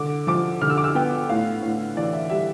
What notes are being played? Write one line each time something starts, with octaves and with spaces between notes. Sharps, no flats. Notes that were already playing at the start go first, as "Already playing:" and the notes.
Already playing: D3 D6
F3 D6
D3 F6
E6
D6
E6
B3 G5
A2 F5
A2
E3 D5
E5
G3 E5